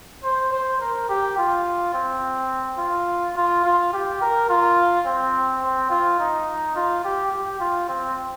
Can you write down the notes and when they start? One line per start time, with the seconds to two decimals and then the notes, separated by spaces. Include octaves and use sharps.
0.24 C5
0.52 C5
0.80 A#4
1.09 G4
1.38 F4
1.94 C4
2.78 F4
3.36 F4
3.65 F4
3.93 G4
4.21 A#4
4.49 F4
5.06 C4
5.63 C4
5.90 F4
6.19 D#4
6.75 F4
7.04 G4
7.32 G4
7.60 F4
7.89 C4